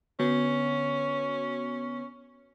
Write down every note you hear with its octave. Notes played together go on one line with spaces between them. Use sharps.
D3 B3 C#4 F#4